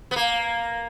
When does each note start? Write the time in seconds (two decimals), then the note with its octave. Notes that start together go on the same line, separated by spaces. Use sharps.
0.11 B3
0.16 A#3